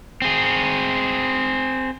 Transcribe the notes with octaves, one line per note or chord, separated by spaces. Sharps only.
C4 G#4